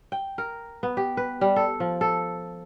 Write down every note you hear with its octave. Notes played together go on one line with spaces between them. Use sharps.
G5
A#4
B3
G4
B4
G3
A4
F3
A4